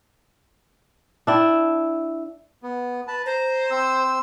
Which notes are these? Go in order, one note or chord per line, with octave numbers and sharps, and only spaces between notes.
D4 E4 G5
B3
B4 A5
C5 A#5
C4 E6